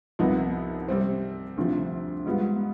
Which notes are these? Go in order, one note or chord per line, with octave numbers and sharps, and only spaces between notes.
C2 C3 F3 B3 D#4
C3 G3 C4
D2 C3 F3
G#2 G3 B3 F4